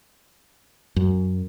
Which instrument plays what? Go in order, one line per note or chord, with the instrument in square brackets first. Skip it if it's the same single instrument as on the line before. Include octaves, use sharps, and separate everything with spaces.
[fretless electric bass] F#2